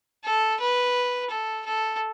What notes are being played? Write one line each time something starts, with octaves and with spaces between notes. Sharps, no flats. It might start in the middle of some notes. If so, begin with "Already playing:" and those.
A4
B4
A4
A4